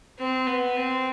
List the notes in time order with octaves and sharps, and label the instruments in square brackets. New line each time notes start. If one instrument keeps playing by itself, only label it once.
[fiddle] C4
B3
C4